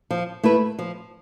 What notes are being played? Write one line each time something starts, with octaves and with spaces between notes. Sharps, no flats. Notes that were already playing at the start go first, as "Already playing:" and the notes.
F3
A3 E4 B4
F3